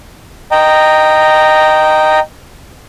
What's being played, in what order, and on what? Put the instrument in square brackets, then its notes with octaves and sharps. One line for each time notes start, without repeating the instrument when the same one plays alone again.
[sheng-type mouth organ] D#5 G5 A#5